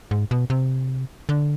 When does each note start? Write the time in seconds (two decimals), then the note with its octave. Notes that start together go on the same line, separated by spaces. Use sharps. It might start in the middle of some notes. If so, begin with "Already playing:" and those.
0.11 G#2
0.31 B2
0.50 C3
1.29 D3